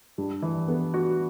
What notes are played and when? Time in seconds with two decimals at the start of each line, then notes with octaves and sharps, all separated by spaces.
0.18 G2
0.42 E3
0.68 B3
0.94 F#4